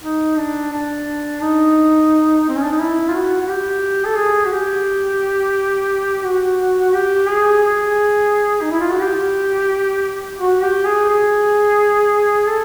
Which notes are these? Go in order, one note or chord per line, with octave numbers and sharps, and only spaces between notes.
D#4
D4
D4
D#4
C4
C#4
D4
D#4
E4
F4
F#4
F#4
G4
A4
G#4
F#4
G4
F#4
G4
G#4
G#4
D#4
E4
F4
F#4
G4
F#4
G4
G#4
G#4
A4